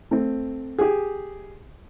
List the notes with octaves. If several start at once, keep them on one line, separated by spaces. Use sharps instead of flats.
A3 C4
G4 G#4